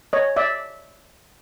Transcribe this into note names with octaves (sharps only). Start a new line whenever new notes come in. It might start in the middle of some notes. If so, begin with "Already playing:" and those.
C#5 D#5
D5 E5